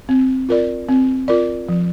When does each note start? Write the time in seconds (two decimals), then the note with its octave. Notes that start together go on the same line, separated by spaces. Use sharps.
0.09 C4
0.49 F4 A#4 D5
0.89 C4
1.28 F4 A#4 D5
1.69 F3